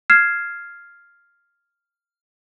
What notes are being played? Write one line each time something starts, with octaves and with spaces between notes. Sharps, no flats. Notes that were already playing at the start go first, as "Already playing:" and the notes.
F6 G#6 C7 E7